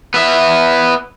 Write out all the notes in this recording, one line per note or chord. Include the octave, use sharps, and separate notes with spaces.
B3 E5